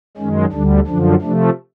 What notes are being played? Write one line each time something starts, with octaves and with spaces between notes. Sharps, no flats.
F#2 D#3 G#3 C#4
D2 D3 G3 D4
F#2 D3 F3 D4
C3 F3 A3 D4